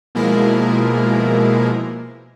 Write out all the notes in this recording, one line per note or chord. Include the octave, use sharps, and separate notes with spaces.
B2 F3 G#3 A#3 E4 A#4